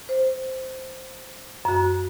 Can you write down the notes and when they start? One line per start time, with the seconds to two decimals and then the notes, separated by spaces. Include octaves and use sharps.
0.09 C5
1.65 F#2 F#4